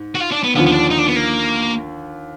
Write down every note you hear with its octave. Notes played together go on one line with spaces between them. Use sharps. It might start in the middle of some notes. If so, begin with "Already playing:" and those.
Already playing: G#2
F#4
F4
D4
B3
D#2 D3 F3 B3
B3
D4
D#4
D4
B3
A#3